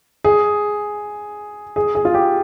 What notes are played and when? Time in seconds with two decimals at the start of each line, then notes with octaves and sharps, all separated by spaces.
0.24 G#4
1.76 G#4
1.95 G#4
2.05 F4
2.14 G4